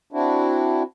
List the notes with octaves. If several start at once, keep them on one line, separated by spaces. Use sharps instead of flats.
C4 D4 E4 F#4